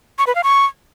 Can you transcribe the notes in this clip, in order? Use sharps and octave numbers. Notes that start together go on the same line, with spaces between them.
C#6
B4
F5
C#6